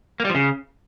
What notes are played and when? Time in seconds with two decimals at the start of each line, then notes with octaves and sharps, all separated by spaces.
0.20 A#3
0.25 G3
0.30 F3
0.35 C#3